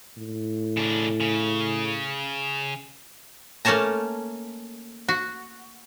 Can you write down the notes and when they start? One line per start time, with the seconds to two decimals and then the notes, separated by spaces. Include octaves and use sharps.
0.17 A2
0.77 C#3 D4
1.21 C#3
3.65 A3 A#3 C#4 C#5 A5 A#5
5.08 F#4